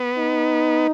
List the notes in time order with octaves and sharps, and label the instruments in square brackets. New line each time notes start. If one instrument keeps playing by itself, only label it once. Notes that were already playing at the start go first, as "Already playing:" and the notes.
Already playing: [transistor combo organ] B3
[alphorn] D#4